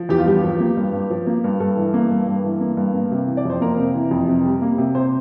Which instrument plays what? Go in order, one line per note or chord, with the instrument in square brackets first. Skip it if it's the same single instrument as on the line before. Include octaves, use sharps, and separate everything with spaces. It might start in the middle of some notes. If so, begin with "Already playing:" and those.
Already playing: [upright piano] F3
E2 G4
F4
G2 G4
F3
A#3
G2
G2
F3
A#3
G2
G2 A4
E3
A#3
G2
G2
E3
A#3
G2
A#3
C3
E3
D5
F2 C5
A#3 A#4
C3
E3
F2
C3
G3
A#3
C3
C3 C5